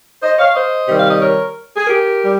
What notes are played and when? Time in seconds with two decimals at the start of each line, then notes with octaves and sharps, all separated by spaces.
0.23 C5 D#5
0.39 C#5 F5
0.56 C5 D#5
0.88 C3 D#3 G3
0.99 F5
1.10 D#5
1.21 A#4 C#5
1.77 G#4
1.87 G4 A#4
2.22 G3